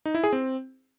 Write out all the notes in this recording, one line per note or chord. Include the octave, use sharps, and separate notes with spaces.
D#4
E4
G#4
C4